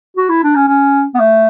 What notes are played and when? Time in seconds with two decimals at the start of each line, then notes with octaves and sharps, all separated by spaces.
0.17 F#4
0.29 E4
0.43 D4
0.55 C#4
0.68 C#4
1.14 B3
1.20 A3